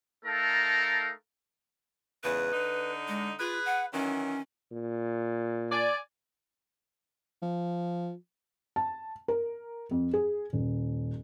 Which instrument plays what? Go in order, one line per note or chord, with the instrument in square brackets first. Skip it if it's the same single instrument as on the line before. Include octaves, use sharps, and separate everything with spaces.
[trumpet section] A3 D#4 A4 A#4 F5 A5
[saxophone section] E2 G#2 C#3 [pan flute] B4
[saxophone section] D3 D4 D#4
[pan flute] G#3
[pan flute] F4 [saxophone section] G#4 B4
[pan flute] F#5
[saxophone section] D#3 E3 F#3 [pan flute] C#4
[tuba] A#2
[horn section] D5 G#5
[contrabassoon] F3
[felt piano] A5
A#4
F2
G#4
D#1